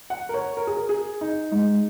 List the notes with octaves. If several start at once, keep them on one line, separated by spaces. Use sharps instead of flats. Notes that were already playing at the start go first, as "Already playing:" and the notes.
F#5
A#4
C#5
A#4
G#4
A#4
G#4
D#4
G#3 D#4